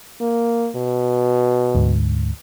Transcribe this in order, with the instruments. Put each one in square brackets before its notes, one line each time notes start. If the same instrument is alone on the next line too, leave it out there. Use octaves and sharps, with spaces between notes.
[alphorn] A#3
B2
[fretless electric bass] D2 G#2